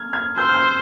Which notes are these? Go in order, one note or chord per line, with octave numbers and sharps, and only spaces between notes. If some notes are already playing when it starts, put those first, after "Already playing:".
Already playing: F6 G#6
F6 G#6
C5 E6 G6
F6
E6 G6